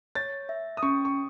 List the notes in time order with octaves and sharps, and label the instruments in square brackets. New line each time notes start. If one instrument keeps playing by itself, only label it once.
[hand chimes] C#5 [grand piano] A6
[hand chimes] E5
[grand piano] D#6
[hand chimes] C#4 [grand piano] C#6
[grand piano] C#6